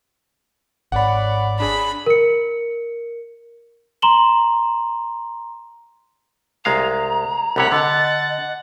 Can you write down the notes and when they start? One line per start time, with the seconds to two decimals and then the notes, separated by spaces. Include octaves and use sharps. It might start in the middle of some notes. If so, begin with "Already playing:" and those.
0.92 G#1 C#5 D5 F#5 B5
1.60 D4 G#4 B5
2.06 A#4 C#7
4.02 A#5 C6 E7 F#7 G7
6.65 C2 G#3 F5 A#5
7.56 C2 C3 C#5 F#5 B5
7.72 D3 D#5 A6